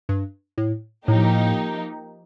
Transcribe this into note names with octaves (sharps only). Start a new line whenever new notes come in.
G2
A2
A2 F3 A#3 D#4 G4